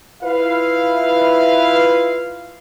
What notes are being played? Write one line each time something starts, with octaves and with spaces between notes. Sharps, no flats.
E4 F4 B4 F5